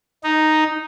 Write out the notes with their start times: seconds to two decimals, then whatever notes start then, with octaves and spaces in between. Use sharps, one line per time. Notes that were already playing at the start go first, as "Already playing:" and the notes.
0.24 D#4